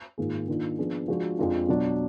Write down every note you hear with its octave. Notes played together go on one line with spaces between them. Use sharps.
G#2 D#3 A#3 F4 G#4
D#3 A#3 D4 F4
F3 B3 D4 G#4
F3 G#3 D4 F#4
F2 F3 G#3 D4 F4
B2 F#3 D4